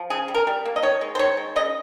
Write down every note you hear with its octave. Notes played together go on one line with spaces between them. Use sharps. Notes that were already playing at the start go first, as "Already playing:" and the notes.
Already playing: F3
C#3 G#4
G3
A#4
G3
A#3
D#5
D#3 C#5
G#3
C5
D#3 C#5
G#3
C#3 D#5